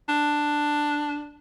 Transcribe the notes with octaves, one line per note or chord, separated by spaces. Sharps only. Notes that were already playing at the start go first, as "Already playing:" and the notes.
D4